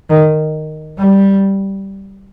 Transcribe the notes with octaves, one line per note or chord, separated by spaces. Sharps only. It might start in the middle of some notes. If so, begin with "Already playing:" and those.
D#3
G3